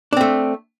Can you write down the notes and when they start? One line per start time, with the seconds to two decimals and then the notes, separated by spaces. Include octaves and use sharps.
0.13 D4
0.17 C4
0.21 A3